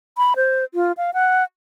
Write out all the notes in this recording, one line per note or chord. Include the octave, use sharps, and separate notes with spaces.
B5
C5
F4
F5
F#5